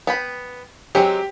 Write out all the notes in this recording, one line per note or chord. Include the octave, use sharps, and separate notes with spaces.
B3 G5 B5
F#3 G#3 C4 G4